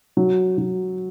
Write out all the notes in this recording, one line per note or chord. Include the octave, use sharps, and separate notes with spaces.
F#3
F#3